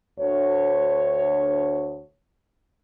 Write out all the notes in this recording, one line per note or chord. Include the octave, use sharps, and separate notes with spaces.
D2 C#5